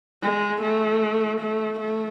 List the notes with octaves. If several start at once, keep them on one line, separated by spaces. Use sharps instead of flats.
G#3
A3
A3
A3